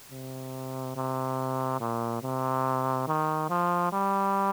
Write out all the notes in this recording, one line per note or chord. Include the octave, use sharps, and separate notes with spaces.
C3
C3
A#2
C3
D#3
F3
G3